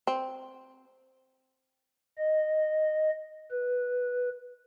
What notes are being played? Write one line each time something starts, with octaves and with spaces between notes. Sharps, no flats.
C4
D#5
B4